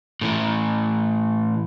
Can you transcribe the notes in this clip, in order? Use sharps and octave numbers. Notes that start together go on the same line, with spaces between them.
A2 E3